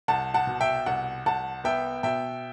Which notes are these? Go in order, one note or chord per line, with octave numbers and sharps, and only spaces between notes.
C2 F#5 A5
F#5 A5
B2
E5 G5
C2 F#5
C2 F#5 A5
B3 E5 G5
B2 E5 G5